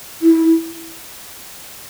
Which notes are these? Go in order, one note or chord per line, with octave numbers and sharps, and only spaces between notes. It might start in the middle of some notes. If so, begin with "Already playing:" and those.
E4